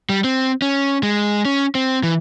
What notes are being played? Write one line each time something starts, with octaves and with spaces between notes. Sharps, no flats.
G3
C4
C#4
G#3
C#4
C4
E3